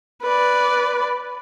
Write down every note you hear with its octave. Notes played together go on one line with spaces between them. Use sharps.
B4 D5